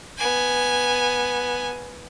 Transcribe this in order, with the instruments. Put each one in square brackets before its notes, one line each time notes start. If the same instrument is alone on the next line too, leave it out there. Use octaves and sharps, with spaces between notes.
[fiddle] B3 G#5